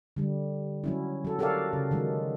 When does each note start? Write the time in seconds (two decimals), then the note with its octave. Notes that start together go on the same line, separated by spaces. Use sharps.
0.16 D3 G3
0.84 F#3 C#4 E4
1.25 F#3 A4
1.39 F#4 G4 A4 A#4 D5 F5
1.73 C#3
1.91 D#3 F#3 G#3